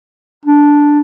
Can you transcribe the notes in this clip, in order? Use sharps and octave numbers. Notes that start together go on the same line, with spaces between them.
D4